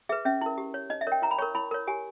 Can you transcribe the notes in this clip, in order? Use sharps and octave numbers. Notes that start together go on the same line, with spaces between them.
G#4 B4 E5
C#4 E5
E4 A#4
G4
C#5
D#4 D#5
E5
A#4 C#5 G5
E4 A#5
B5
A#4 C#5 C#6
E4 B5
A#4 C#5
G4 G#5